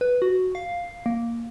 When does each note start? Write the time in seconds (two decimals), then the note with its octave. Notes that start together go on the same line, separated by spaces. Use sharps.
0.01 B4
0.22 F#4
0.55 F5
1.06 A#3